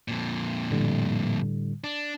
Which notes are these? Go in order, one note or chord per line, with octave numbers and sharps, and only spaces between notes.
F2 A#2
A2 D3 G3
D4